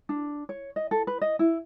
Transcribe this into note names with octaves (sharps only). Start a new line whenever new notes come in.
D4
C#5
D#5
A4
B4
D#5
E4